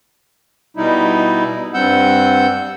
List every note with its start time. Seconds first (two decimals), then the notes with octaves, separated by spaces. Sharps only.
0.77 B2 G3 D#4 E4
1.74 G2 G3 C4 F#5 E6 G6